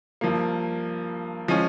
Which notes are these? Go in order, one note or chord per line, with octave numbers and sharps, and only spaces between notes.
G2 F3 A#3
F3 G#3 C#4